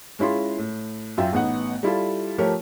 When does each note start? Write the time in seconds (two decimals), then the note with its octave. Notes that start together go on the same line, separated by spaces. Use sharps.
0.19 G#3 C#4 E4 F4 C6
0.58 A2
1.17 F#2 F4 E5 G5
1.33 A1 B3 D#4 F#5
1.83 G3 E4 F4 A4
2.38 F3 A3 G4 A#4 C#5